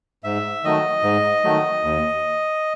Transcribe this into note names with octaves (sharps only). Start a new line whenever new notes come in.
G#2 E5
D#3 F#3 A3 D#5
G#2
D#3 F#3 A3
D#2